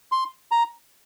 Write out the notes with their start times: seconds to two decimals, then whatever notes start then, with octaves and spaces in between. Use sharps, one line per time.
0.12 C6
0.51 A#5